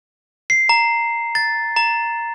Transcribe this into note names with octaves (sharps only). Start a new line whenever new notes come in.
C7
A#5
A6
A#5